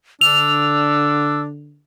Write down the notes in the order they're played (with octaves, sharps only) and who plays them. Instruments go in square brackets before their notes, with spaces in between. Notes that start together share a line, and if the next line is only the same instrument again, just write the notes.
[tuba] D3 [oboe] D4 [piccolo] E6 [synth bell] F7